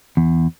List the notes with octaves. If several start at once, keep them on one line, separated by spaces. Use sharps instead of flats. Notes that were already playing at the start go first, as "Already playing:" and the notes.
E2